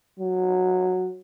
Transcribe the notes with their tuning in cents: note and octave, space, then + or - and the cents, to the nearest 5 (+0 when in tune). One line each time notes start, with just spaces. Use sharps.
F#3 -10